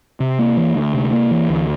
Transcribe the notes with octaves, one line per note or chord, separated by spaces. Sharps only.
C3
A#3
E3
D2
C3
A#3
E3
D2